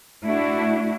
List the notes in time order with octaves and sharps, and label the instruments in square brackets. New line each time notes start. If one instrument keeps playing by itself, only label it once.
[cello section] A3 D4 E4 F#4